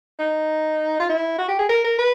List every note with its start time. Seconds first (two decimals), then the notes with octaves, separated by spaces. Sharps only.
0.19 D#4
1.00 F4
1.09 E4
1.38 F#4
1.48 G4
1.59 G#4
1.69 A#4
1.84 A#4
1.99 B4